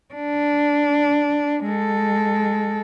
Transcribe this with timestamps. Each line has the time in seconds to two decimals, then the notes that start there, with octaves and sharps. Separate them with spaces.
0.15 D4
1.65 G#3 A4